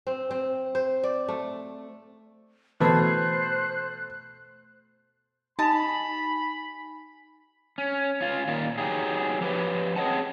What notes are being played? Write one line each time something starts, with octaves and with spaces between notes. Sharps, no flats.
C4
C4
C5
D5
A3
B2 E3 A3 B4 C5 F#6 G#6
D#4 D#5 G#5 A5 B5
C#4
C#4 F4
A#2 D#3 F4
F#3 D#4 G4 G#4
F3 G4 A#4 B4 C#5
C4 G#4 C#5 D#5 F#5 A5